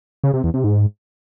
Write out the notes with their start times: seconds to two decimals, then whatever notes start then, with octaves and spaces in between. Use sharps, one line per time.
0.24 C#3
0.34 C3
0.44 E2
0.54 C3
0.64 G#2